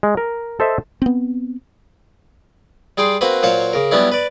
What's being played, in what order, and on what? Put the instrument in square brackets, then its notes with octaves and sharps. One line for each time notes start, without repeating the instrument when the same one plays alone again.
[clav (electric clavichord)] G#3
A#4
A4 C5 D#5 E5
[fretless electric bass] B3 C4
[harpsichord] G3 G#4 G5 C6 D6
A#3 C4 F#4 B4
A#2 F#3 C5 C#5 F5 C#6
C#3 A#4
F#3 G3 B3 C#4 D4 E4
B4 D5